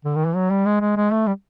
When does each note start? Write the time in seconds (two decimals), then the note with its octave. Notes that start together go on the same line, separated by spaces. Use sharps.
0.05 D3
0.15 D#3
0.25 E3
0.35 F#3
0.51 G3
0.66 G#3
0.81 G#3
0.97 G#3
1.12 A3
1.27 G3